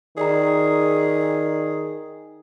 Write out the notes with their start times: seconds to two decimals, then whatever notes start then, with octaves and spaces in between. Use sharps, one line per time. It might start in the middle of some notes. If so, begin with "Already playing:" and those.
0.17 D#3 G#4 D5 A#5